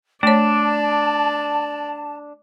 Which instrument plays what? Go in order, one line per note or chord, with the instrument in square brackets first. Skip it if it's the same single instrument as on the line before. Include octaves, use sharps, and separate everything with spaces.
[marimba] A3 C#5 [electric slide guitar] D4 [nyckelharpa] D5 [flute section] A5